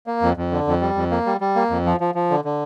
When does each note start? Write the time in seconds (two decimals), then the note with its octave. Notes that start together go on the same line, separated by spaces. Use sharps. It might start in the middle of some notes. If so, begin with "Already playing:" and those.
0.07 A#3
0.22 F2
0.37 F2
0.51 D3
0.67 F2
0.81 G3
0.96 F2
1.11 A#3
1.26 G3
1.41 G3
1.56 A#3
1.70 F2
1.86 F3
2.00 F3
2.15 F3
2.30 D3
2.45 D3